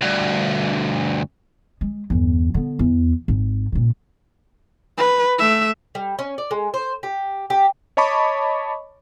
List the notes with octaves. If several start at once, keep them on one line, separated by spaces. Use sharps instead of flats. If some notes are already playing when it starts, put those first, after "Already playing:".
D2 G2
G#3
G1 E2
D3 B3
E2
G#1
A#2 C#3
B4
A3 E5
G3
C#4
D5
G#3
C5
G4
G4
C#5 D#5 A5 B5 C#6 D6